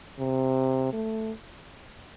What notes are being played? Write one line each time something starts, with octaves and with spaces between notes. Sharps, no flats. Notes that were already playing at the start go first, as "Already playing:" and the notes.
C3
A3